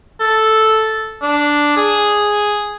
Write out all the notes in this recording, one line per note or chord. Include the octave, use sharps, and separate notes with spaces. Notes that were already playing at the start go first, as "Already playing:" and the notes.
A4
D4
G#4